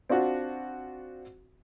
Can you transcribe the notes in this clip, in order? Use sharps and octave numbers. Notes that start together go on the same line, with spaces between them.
C4 D4 F4 F#4